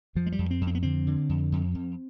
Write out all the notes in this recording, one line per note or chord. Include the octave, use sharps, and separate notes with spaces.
F2 F3
G#3
G3
F2
C4
F2
C4
B3
D3 C4
D3
F2
F2
F2